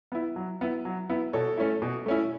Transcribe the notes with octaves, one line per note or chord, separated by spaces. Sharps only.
B3 E4
F#3
B3 E4
F#3
B3 E4
B2 A4 C#5
A3 C#4 E4
B2
A3 C#4 E4